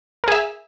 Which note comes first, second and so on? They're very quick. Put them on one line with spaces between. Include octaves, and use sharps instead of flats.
A#4 G#4 E5